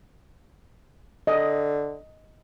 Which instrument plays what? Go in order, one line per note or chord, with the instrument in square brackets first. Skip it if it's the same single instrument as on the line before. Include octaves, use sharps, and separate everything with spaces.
[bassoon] D3 [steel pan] D#5